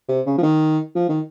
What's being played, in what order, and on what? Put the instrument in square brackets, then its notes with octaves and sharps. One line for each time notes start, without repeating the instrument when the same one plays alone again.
[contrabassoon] C3
C#3
F3
D#3
F3
D#3